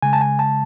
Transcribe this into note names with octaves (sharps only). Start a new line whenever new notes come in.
C#3 G#3 G#5
A5
G#5
A5